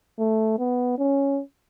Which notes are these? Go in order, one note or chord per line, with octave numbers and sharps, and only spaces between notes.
A3
B3
C#4